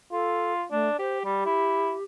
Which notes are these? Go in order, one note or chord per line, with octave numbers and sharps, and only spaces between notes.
F4 A4
A3 D4
G4 C5
G3 G4
E4